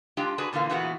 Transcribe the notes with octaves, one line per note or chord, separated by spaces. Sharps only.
G#3 D4 F4 G4 G5
D4 F#4 G#4 B4
A#2 D3 E3 A#3 F5
A#2 E3 G#3 B3 F#4